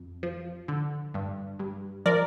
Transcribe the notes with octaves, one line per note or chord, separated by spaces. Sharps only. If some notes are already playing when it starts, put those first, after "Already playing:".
Already playing: F2
F3
D3
G2
G2
F3 A#4 D5